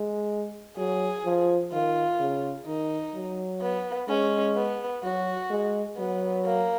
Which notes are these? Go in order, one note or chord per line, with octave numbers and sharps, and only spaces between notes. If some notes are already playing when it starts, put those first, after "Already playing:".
Already playing: G#3
F#3 G#4
F3
D#3 F4
C#3
D#3 D#4
F#3
B3
G#3 C#4
B3
F#3 F#4
G#3
F#3 B3
A#3